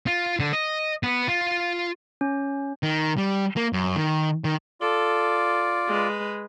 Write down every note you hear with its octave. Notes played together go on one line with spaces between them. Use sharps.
F4
D3
D#5
B3
F4
C#4
D#3
G3
A#3
F#2
D#3
D#3
F4 A4 D5
G#3 B4